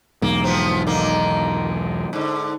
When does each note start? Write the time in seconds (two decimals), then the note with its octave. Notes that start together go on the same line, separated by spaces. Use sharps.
0.22 B1 E2 G#2 A#3
0.44 F3 B3 C4
0.87 D3 D#3 A#3
2.13 G#2 D3